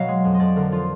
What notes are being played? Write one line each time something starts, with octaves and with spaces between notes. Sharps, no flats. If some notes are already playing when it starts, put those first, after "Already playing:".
Already playing: B2 F#3 D#5 F5
G#3
F2
D#5
F2 D5
D3 A#4
F3 F4